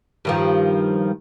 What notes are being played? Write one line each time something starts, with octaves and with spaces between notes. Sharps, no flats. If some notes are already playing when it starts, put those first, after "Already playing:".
G2 D#3 F3